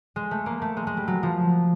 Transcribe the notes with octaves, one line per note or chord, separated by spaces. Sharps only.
G#3
A3
A#3
A3
G#3
G#3
G3
F#3
F3